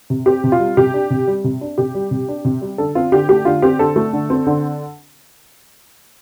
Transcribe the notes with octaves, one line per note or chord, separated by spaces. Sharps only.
C3
C4 G4
C3
F4
G3
C3 G4
D4
C3
G3
C3
D4
C3 G4
G3
C3
D4
C3
G3
D3 A4
C4 F4
D3 G4
A3 G4
D3 F4
C4 G4
D3 A4
A3
D3
C4
D3